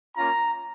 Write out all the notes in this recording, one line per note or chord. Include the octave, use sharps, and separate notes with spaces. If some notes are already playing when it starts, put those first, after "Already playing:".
A#3 C#4 F4 A#5